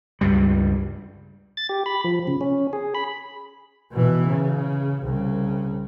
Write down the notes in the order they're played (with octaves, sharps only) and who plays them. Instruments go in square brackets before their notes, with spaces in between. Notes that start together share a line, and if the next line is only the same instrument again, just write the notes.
[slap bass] C#2 G2 G3
[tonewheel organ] A6
G4
B5
F3
C#3
C#4
G#4
B5
[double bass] B2 E3
C#3
C2 C#3